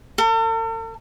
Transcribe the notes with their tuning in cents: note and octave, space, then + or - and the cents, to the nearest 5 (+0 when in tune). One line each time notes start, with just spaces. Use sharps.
A4 +45